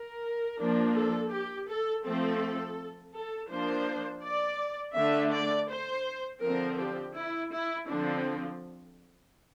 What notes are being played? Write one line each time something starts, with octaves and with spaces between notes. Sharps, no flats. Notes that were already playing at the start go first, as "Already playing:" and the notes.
Already playing: A#4
F3 A#3 D4
A4
G4
A4
F3 A3 C4 A4
A4
F3 A#3 D4 C5
D5
D3 A3 D4 E5
D5
C5
D3 F3 C4 A#4
G4
E4
E4
D3 F3 C4 D4